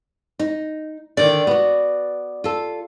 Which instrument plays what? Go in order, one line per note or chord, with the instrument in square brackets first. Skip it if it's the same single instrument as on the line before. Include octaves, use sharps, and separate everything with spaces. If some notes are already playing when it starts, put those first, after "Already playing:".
[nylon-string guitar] D#4
[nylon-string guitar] D3 D#3 [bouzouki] D5
[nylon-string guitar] B3 F#4
F4 A4